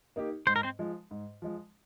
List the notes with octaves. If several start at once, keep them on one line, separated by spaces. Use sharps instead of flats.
A#3 D#4 G4
G#2 C5
A#4
C4 C5
F3 G#3
G#2
F3 G#3